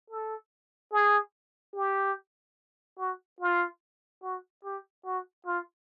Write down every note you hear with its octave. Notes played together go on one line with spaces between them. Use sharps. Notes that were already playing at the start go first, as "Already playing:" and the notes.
A4
G#4
G4
F#4
F4
F#4
G4
F#4
F4